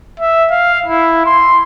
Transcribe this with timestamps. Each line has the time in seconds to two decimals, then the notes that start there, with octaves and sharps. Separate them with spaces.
0.20 E5
0.50 F5
0.86 E4
1.26 C6